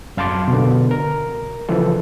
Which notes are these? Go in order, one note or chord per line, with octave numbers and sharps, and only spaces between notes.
F#2 F5 A5 C6 D6
B2 D3
A#4
C#3 E3 F3 A4